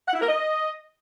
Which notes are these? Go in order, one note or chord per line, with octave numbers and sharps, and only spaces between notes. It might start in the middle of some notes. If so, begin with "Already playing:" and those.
F#5
E4
A#4
D#5